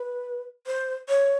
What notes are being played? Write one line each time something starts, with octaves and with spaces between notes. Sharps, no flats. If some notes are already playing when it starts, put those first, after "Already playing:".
Already playing: B4
C5
C#5